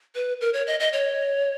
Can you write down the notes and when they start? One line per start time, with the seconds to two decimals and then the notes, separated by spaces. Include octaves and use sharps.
0.15 B4
0.41 A#4
0.54 C#5
0.67 D#5
0.80 D#5
0.93 C#5